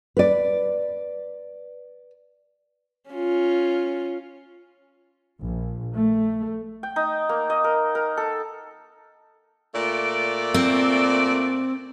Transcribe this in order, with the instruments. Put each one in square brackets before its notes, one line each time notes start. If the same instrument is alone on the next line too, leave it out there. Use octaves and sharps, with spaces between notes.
[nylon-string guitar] B4 D5
[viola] C#4 F4
[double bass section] A#1
A3
[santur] G5
D#4
A#3
D#5
A#4
A#4
A4
[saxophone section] A#2 A3 D5
[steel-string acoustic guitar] C4